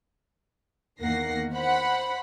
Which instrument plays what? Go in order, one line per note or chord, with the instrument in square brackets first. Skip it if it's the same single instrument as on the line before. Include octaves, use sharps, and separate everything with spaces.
[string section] E2 D#3 A#3 F#5 A#6 C7
C5 F#5 B5